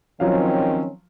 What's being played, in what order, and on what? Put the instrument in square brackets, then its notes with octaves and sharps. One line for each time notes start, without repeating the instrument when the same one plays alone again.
[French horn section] D#3 C4 C#4 [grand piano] F3 F#3 F5